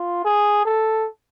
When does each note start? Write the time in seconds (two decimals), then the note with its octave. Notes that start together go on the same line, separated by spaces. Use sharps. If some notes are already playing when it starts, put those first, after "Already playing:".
Already playing: F4
0.25 G#4
0.65 A4